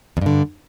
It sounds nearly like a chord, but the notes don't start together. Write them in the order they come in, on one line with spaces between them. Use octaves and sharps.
E2 G2 D3